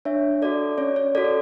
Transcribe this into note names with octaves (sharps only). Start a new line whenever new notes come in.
D4 C#5 E5
F#4 A4 D5
C#4 C#5
C#5
F#4 A4 D5